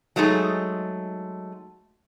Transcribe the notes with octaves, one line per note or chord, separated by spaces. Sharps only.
F#3 G#3 A3 D#4 G#4